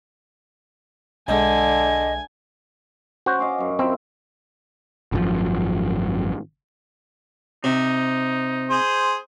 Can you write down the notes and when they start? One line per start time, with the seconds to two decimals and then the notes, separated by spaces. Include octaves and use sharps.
1.28 B1 D3 G#3 D#5 E5 G#5
3.26 C#4 F#4 C5
3.39 D#5 F5 D6
3.58 F#2 F#3
3.79 C4 E4 F4 A#4
5.12 G#1 F#2 D3 F3
7.64 C3 D#4
8.70 G#4 C5